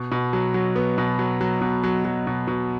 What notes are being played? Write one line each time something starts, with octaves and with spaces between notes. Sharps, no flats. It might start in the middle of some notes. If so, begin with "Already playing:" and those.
Already playing: B2
B2
F#3
F#3
B3
B2
F#3
F#3
B2
F#3
F#3
B2
B2